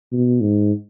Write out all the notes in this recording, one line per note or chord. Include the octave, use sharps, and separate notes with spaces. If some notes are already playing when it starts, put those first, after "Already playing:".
B2
G#2